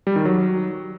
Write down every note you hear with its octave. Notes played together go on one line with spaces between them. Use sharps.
G3
D#3
F#3